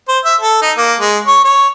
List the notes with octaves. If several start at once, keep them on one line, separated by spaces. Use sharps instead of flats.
C5
E5
A4
D#4
A#3
G#3
C#5
C#5